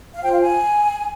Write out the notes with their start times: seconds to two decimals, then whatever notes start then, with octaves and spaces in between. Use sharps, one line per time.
0.14 F5
0.21 F4 C5 G5
0.31 F5
0.41 G#5